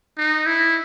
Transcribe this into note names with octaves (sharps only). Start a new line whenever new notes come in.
D#4
E4